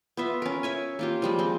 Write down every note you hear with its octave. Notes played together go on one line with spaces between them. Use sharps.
B3 F4 E5
C#4 A#4
C#5 E5 G#5
A#3 F4 G4
F3 G3 G#3
G#3 C4